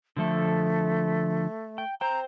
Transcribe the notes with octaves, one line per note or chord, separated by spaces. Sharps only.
D3 F3 A3 A4
G5
C5 G5 A#5